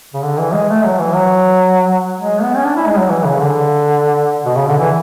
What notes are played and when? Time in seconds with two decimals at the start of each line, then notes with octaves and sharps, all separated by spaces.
0.14 C#3
0.23 D3
0.38 E3
0.53 G#3
0.69 A3
0.84 F#3
0.99 E3
1.14 F#3
2.20 G#3
2.42 B3
2.57 C#4
2.65 D4
2.76 E4
2.87 G#3
2.99 F#3
3.09 E3
3.25 C#3
3.40 D3
4.45 B2
4.56 C#3
4.68 D3
4.79 E3